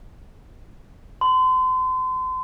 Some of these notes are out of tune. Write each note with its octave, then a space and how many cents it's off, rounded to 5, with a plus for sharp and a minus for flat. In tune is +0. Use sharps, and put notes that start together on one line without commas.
C6 -35